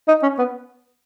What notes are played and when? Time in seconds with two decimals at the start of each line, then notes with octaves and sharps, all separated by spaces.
0.08 D#4
0.23 C#4
0.38 B3